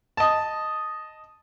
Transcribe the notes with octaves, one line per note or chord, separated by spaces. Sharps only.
D#5 A5